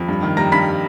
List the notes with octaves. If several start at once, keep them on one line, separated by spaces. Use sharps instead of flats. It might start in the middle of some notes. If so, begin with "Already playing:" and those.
Already playing: F2 B5
G2
D#3
G3 A#5 A#6
G2 B5 B6